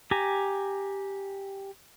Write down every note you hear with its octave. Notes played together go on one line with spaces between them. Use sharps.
G4 G#5 A#5